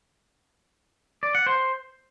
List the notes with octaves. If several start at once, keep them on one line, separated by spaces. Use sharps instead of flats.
D5
F#5
C5